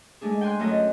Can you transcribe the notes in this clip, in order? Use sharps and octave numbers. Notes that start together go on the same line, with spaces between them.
G#3 A3 D4 G#4
G5 G#5 C6 F#6
F#2 A3 F#4 D#5